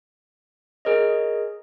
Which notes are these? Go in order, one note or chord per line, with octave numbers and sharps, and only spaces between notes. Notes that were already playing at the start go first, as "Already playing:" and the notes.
G#4 A#4 C#5 D#5